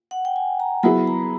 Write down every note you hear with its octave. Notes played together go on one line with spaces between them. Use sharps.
F#5
G5
G#5
A#5
F#3 B3 E4 G#4 B5
A#5